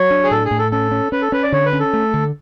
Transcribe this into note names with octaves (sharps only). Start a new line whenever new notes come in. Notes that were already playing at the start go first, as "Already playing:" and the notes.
Already playing: F#3 C#5
D4
G#4
A2 A4
G#4
A2
A4
C#4 A4
C#4
C#4 B4
A4
C#4 B4
D5
D3 C#5
B4
C#4
A4
A3
D3